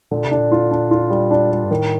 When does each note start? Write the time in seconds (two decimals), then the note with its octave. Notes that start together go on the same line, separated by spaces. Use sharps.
0.11 A#2 D3
0.25 C3
0.31 D4
0.38 A#2
0.52 F4
0.71 D4
0.91 F4
1.10 G3
1.31 D4
1.51 G3
1.64 G2
1.70 A2 D#3